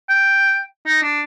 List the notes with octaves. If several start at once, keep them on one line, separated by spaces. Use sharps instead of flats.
G5
D#4
D4